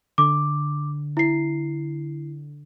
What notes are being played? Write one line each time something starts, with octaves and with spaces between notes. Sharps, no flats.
D3 D6
E4 C7